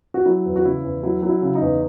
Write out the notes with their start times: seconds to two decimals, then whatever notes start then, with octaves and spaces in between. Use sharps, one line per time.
0.14 F#4
0.25 F#3 E4
0.45 E2
0.56 F#4
0.65 C#3 E4
0.84 E2
1.03 F#3 E4
1.22 F#3
1.29 E4
1.42 C#3
1.55 D#4
1.62 E2